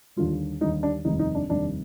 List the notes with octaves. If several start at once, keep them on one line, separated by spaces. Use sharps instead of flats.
D#2 D3 G3 F4
D#2 D3 G3 D#4
D4
F1 D#2 D#3 G3 D#4
D#4
D4
F1 D#2 D#3 G3 D4